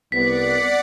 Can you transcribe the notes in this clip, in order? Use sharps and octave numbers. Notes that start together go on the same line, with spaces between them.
C2 B3 D5 F#5 B6